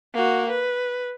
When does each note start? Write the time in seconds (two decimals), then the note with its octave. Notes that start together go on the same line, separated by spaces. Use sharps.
0.15 A#3 F#4
0.49 B4